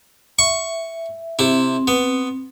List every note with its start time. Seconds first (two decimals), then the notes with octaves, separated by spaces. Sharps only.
0.39 E5 C#6
1.39 C3 C4 E4
1.88 B3